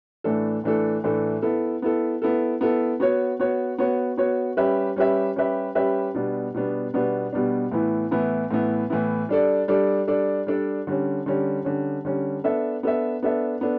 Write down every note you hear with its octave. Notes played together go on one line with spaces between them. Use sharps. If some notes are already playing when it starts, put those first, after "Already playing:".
A2 E3 A3 D4 A4
A2 E3 A3 D4 A4
A2 E3 A3 D4 A4
B3 E4 A4
B3 E4 A4
B3 E4 A4
B3 E4 A4
B3 F#4 C#5
B3 F#4 C#5
B3 F#4 C#5
B3 F#4 C#5
G3 C#4 G4 B4 E5
G3 C#4 G4 B4 E5
G3 C#4 G4 B4 E5
G3 C#4 G4 B4 E5
B2 G3 B3 D4
B2 G3 B3 D4
B2 G3 B3 D4
B2 G3 B3 D4
A2 E3 B3 E4
A2 E3 B3 E4
A2 E3 B3 E4
A2 E3 B3 E4
G3 D4 A4 D5
G3 D4 A4 D5
G3 D4 A4 D5
G3 D4 A4 D5
D3 G3 C#4
D3 G3 C#4
D3 G3 C#4
D3 G3 C#4
B3 D4 A4 E5
B3 D4 A4 E5
B3 D4 A4 E5
B3 D4 A4